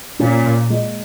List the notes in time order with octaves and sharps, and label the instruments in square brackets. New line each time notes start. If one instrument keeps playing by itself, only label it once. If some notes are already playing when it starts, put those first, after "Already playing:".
[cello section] A#2 [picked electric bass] C#4
[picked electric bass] A#2
G#3